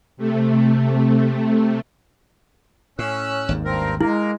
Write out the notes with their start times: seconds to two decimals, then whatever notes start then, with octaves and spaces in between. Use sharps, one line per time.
0.17 C3 A3
2.99 A2 C#4 E6 F#6
3.49 G#1 D#2 G#2
3.65 G2 C4 A#4
4.01 G#3 A#3 E4 A#4